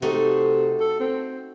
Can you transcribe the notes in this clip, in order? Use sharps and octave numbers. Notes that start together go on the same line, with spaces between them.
C3 A3 D#4 F#4
A4
C4